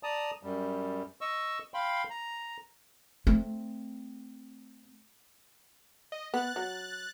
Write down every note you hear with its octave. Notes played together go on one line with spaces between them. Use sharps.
D5 A5 A#5 D#6
F#2 G3
D#5 C#6 E6
F5 G5 B5 C6
A#5
A3 C4
D#5
B3 F#6 A6
F#3